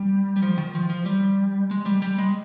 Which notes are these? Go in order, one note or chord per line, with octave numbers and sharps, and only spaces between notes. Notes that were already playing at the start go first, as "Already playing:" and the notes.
Already playing: G3
G3
F3
D#3
F3
F3
G3
G#3
G3
G3
G#3